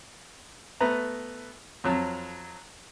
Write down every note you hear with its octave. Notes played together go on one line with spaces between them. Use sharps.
A3 B3 B4 A#5
F2 F#3 A5